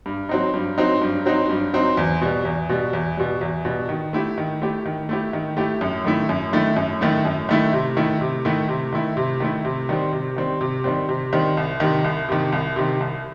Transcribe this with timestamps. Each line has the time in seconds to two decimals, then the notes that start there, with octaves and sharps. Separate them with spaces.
0.06 G2
0.29 F#3 C4 D#4
0.54 G2
0.78 F#3 C4 D#4
1.02 G2
1.26 F#3 C4 D#4
1.50 G2
1.74 F#3 C4 D#4
1.97 E2
2.21 B2 G3
2.45 E2
2.69 B2 G3
2.93 E2
3.17 B2 G3
3.41 E2
3.65 B2 G3
3.89 D#3
4.13 A3 E4 G4
4.38 D#3
4.62 A3 E4 G4
4.85 D#3
5.09 A3 E4 G4
5.33 D#3
5.57 A3 E4 G4
5.81 F#2
6.05 D#3 A3 E4
6.29 F#2
6.53 D#3 A3 E4
6.76 F#2
7.01 D#3 A3 E4
7.25 F#2
7.49 D#3 A3 E4
7.73 C3
7.97 D#3 A3 E4
8.21 C3
8.45 D#3 A3 E4
8.69 C3
8.93 D#3 A3 E4
9.17 C3
9.40 D#3 A3 E4
9.65 C3
9.89 D#3 G3 C4
10.13 C3
10.36 D#3 G3 C4
10.61 C3
10.84 D#3 G3 C4
11.09 C3
11.33 D#3 G3 C4
11.57 C2
11.80 C3 D#3
12.04 C2
12.29 C3 D#3
12.52 C2
12.76 C3 D#3
13.01 C2